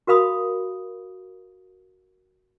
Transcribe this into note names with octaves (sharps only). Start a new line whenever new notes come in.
F#4 A#4 F5 B5 D#6